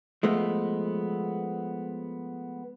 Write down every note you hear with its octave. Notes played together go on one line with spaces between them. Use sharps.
F3 G#3 A3 B3